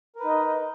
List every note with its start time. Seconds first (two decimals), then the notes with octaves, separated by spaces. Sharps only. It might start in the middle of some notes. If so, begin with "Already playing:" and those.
0.15 A#4
0.20 B4
0.24 D#4
0.28 D#5